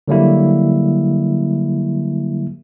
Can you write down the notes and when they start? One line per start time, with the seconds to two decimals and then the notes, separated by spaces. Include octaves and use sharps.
0.08 D3 F#3 G3 A#3 E4